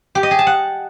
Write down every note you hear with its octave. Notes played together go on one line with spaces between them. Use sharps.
G4
D#5
G#4
A5
F#5